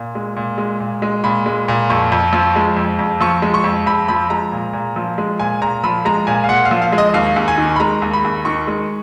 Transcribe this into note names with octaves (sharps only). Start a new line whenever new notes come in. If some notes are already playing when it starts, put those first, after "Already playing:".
Already playing: A#2
G#3
A#2
G#3
A#2
G#3
A#2 B5
G#3
A#2
F2 C#6
F2
F3
G#3
F2
F2
F3 C#6
G#3
C#6
F2
F2 B5
F3 B5
G#3 A#5
A#2
A#2
F3
G#3
A#2 G#5
A#2 A#5
F3 B5
G#3 A#5
A#2 G#5
F5
A#2 F#5
F5
F3
F5
G#3
D#5
D#5
D#2 F5
D#2
G#5
D#3
B5
G#3 A#5
D#2
B5
D#2
D#3 C#6
G#3